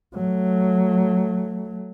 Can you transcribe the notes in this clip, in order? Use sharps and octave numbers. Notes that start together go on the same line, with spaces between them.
F#3 A3